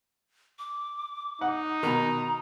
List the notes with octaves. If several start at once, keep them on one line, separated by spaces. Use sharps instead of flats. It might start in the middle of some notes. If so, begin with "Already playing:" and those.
D6
D#4 F#5
B2 D#3 A#5